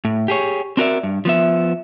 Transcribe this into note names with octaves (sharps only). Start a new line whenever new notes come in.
A2
G4 G#4 C#5
C4 D4 F#4 A#4 D5 E5
G2
F3 B3 E5